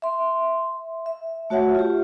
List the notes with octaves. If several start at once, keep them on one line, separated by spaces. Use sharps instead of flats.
E5 C6
E5
A3 F#4 C#5 E5 F#5
F4 G4